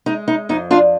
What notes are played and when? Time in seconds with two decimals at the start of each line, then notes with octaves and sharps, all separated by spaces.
0.06 G#3 D#4
0.28 D#4
0.49 F2 D#4
0.71 D4 F4